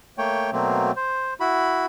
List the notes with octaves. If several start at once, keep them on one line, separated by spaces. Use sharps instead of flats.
A3 A#3 C#5 G5
B2 F#3 A3 A#3 C4
C5
E4 F#4 B5